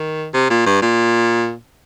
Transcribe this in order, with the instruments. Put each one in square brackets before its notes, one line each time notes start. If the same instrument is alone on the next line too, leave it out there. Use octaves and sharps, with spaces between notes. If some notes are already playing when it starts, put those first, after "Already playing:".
Already playing: [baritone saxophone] D#3
C3
A#2
G2
A#2